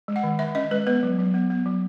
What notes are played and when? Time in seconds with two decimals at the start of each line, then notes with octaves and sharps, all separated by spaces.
0.08 G#3
0.16 F#5
0.23 D#3
0.39 D#3 E5
0.55 C#4 D#5
0.71 G#3 B4
0.87 B3 B4
1.03 F#3
1.18 F#3
1.34 B3
1.50 B3
1.66 F#3